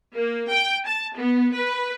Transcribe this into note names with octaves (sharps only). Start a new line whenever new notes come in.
A#3
G5
A5
B3
B4